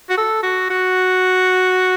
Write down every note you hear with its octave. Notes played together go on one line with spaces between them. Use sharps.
F#4
A4
F#4
F#4